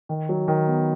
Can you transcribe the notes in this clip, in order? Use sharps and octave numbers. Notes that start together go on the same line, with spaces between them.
D#3
F#3
D#3
B3